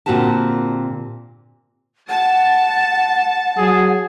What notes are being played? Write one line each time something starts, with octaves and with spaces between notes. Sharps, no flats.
A#2 D3 C4 F#4 G4 A5
F#5 A5
F#3 G#4